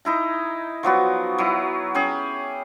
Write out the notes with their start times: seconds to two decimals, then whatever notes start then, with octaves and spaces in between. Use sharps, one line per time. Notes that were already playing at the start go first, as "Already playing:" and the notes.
0.05 D#4 E4 A#5
0.83 F3 F#3 B3 F#4
1.38 F#3 E4
1.94 C#4 G4 G#4